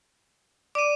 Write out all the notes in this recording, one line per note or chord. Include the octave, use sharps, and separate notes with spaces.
D5 D6 D#7